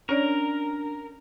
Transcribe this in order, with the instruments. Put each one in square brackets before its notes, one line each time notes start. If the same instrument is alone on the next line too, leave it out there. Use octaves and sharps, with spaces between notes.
[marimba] C#4 C#5 D5 [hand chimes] D4 [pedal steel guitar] A#4